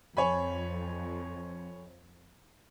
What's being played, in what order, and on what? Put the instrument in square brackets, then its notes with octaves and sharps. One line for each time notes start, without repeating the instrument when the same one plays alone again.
[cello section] F2 [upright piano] C#5 G#5 B5